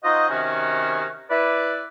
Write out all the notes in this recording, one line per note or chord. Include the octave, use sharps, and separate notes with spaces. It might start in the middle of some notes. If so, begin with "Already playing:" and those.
D#4 F4 F#4 C5 D#5
C3 D#3 C#4 F#4
E4 B4 D5